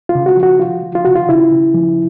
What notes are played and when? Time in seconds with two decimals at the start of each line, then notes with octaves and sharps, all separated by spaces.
0.09 F4
0.15 C#3
0.26 F#4
0.37 F3
0.43 F#4
0.60 F3 F4
0.83 F3
0.95 F4
1.05 C#3 F#4
1.16 F4
1.29 C#3 E4
1.52 C#3
1.74 F3